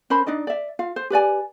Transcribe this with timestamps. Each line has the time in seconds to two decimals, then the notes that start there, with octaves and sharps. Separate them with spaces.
0.10 C#4 A#4 C5 B5
0.27 D4 D#4 D5 D#5
0.47 D5 E5
0.79 F4 F5
0.96 C5
1.10 G4 B4 D5 G#5